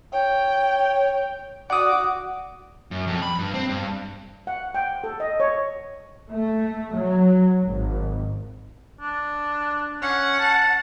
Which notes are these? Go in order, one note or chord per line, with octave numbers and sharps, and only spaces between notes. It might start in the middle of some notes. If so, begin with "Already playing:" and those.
C#5 G5
F#4 D5 F#5 D6 D#6
F#2
F2
B5
G2
C4
G2
F#5
G5
A4
D#5
C#5
A3
F#3
G#1
D4
C#4 F#5
A5